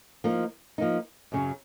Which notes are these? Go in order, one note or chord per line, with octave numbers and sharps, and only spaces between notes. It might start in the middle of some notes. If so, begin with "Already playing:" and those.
F3 A#3 D#4
F3 A#3 D#4
F#2 C#3 F#3